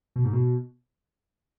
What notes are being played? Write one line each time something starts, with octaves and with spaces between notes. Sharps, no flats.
B2
G#2
B2